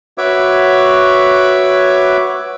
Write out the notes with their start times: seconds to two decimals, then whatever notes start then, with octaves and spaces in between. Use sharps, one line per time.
0.18 F#4 B4 C#5 E5 D6